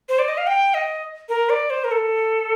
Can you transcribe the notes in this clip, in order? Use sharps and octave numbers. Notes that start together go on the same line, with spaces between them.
C5
D5
D#5
F5
G5
D#5
A#4
D5
C5
A#4
A4